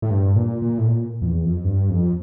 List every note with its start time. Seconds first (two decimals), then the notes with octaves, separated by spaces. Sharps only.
0.02 A2
0.11 G2
0.36 A#2
0.62 A#2
0.78 A2
0.88 A#2
1.22 F2
1.26 E2
1.45 F2
1.64 G2
1.90 F2